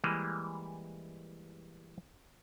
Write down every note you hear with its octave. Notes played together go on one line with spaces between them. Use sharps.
E3 G3 G#3 A#3